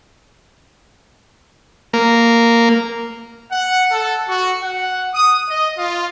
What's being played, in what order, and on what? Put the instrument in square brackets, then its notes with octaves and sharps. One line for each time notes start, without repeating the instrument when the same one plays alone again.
[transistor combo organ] A#3
[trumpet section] F#5
A4
F#4
F#5
D#6
D#5
F4